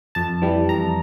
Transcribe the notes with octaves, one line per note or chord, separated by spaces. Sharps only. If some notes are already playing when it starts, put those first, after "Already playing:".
F2 A5
E3 G3
F2 A#5